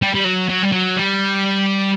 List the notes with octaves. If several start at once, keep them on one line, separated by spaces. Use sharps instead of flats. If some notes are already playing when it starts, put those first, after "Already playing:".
G3
G3
F#3
F#3
G3
F#3
G3